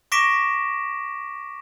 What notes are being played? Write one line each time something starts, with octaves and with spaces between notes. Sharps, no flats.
C#6 D6 A#6 B6 D7 E7